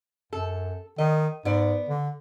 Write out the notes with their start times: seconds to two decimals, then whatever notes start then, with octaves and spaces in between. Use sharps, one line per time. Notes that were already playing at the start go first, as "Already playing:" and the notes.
0.33 F#2 A4
0.98 D#3 D#5
1.45 G#2 B3 D5
1.89 D3